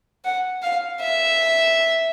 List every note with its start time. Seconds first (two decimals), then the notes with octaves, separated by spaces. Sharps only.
0.25 F#5
0.63 F5
1.01 E5